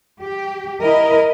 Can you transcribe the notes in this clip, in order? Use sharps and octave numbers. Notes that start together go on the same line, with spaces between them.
G4
E4 A#4 D#5